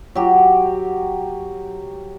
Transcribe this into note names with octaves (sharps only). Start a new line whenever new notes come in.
F#3 G4